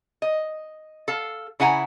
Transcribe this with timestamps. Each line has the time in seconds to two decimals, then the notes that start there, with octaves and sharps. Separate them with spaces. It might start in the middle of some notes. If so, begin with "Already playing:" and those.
0.22 D#5
1.08 A4 F5
1.60 C#3 E4 F#5 G#5 A#5